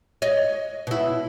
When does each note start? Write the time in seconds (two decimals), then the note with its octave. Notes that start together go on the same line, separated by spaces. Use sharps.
0.22 C#5 D#5
0.87 B2 E4